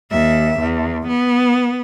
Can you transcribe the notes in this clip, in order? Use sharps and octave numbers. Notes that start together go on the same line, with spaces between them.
D#2 E5
E2
B3